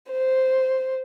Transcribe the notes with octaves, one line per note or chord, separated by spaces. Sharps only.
C5